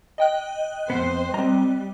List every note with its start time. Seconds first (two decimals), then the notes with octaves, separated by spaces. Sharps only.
0.18 D#5 G5 F#6
0.90 F2 G#2 B3 C5
1.34 G3 C4 A#5